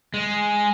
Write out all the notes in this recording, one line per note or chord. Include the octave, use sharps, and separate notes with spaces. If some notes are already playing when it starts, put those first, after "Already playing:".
G#3